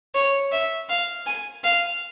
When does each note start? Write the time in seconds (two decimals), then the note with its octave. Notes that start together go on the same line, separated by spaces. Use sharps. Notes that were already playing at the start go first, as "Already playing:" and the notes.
0.15 C#5
0.52 E5
0.89 F5
1.26 G#5
1.64 F5